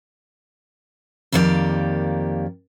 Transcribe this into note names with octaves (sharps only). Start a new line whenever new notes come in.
F2 D#3 A#3 F#4 G4 D5